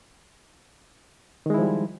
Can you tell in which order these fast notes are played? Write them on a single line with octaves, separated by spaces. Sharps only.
D#3 G#3 E4 F3 G3